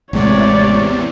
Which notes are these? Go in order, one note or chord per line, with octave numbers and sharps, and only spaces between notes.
A1 E2 C3 G#3 C#5 D5